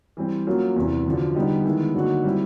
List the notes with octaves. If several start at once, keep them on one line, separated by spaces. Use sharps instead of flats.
E3 G3 C4
F#3 A#3 C#4 F4
E2 C3 E3
F#2 D3 F3
D3 G3 B3 D#4 G4
D#3 G#3 B3 E4
D3 F#3 A#3 D#4 F#4
G3 C4 E4